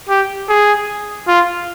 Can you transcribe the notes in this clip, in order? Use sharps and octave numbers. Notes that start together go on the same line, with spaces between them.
G4
G#4
F4